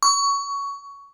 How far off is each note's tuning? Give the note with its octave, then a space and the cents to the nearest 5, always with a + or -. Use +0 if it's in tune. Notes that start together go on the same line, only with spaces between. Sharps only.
C#6 +20